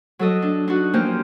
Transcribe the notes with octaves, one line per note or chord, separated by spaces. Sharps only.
F#3 A4 D#5
D4
D4 D#4 F#4
F3 A#3 C4 C#4 G4